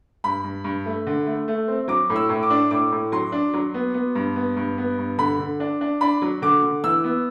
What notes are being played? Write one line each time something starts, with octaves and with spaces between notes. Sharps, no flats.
G2 B5
G2
G2
A3
D3
A3
A3
C4
F#3 D6
A2
E6
A2
D6
D4
A2 D6
A2
F#3 C6
D4
F#3
B3
B3
G2
B3
G2
B3
G2
D3 B5
D3
D4
D4
D4 B5
F#3
D3 D6
D3
E3 E6
B3